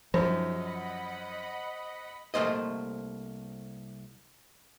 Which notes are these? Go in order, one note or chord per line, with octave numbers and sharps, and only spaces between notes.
F#2 F3 G#3 D#4 C5
D#5 F#5 B5
C2 A3 A#3 C5 D#5